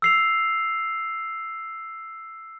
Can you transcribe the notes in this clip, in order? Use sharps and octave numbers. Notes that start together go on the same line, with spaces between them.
E6 C7 F7